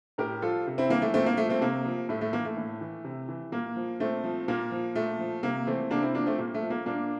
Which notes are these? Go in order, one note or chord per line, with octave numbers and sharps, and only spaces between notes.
A2 G4 A#4
F3 F4 A4
C3
C4 E4
E3 A#3
A3
A#2 A3 C4
A#3
F3 A3
A3 C4
C3 A#3
F3
A2 A3
A3
E3 A#3
A3
A2
E3
C3
E3
A#2 A#3
F3
A#2 A3 C4
F3
A#2 A#3
F3
A#2 A3
F3
C3 A#3
E3 A3 C4
C3 A#3 D4
C4 E4
F3 A#3 D4
A3 C4
A#2 A#3
A3
F3
A#3
A#2 A#3 D4